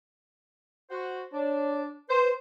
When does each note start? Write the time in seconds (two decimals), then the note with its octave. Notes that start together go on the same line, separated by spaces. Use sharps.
0.90 F#4 C5 F#5
1.32 D4 C#5
2.09 B4 C5